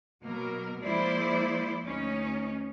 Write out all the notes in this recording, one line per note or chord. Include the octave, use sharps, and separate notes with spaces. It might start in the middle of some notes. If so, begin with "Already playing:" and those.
B2 F#3 A#3 A#4
F3 G#3 A#3 E4 C5 D5
D2 C#4 D#4